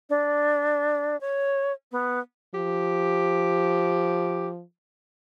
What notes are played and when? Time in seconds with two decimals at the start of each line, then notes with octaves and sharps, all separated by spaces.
0.10 D4
1.21 C#5
1.92 B3
2.55 F3 G4